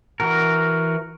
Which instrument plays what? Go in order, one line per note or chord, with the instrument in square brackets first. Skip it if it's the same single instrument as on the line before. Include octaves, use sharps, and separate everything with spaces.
[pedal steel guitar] E3 F#4 A#4